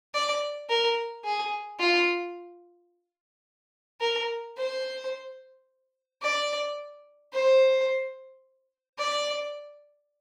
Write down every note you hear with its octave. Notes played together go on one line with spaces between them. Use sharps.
D5
A#4
G#4
F4
A#4
C5
D5
C5
D5